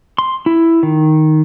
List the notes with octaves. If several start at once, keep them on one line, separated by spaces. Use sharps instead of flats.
C6
E4
D#3